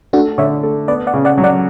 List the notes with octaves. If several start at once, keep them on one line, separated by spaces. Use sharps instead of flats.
A3 D4 F#4
D3 C#5 E5
A3
B3 B4 D5
D5 F#5
C#3
D5 F#5
F#3
D5 F#5